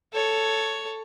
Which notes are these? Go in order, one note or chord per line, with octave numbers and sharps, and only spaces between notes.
A4 C#5